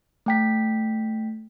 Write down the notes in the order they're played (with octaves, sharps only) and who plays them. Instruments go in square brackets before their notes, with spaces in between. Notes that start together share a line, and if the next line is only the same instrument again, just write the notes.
[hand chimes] A3 G5 B6